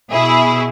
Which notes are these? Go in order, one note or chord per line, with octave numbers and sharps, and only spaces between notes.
B2 E4 G#4